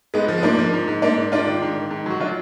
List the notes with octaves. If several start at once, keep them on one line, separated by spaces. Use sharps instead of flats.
G#2 G#3 B3
F3
B3
G#2 A#3 D4
F3
G#2
G#2
G#2 A#3 D4
G#2
G#2 D4 F4
D#3
G#2
D#3
G#2
F#3 F#4
F#3 D4 F4